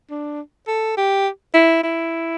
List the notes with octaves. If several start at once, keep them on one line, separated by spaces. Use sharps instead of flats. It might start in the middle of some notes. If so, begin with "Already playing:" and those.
D4
A4
G4
E4
E4